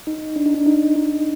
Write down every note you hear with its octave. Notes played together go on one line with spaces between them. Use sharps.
D#4
D4
D#4
D4
D#4
D#4